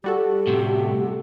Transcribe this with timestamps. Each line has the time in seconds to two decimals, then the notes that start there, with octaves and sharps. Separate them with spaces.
0.04 G3 F#4 G4 A4
0.47 A2 C3